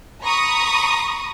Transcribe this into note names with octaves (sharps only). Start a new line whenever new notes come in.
A#5 B5 C#6 D#6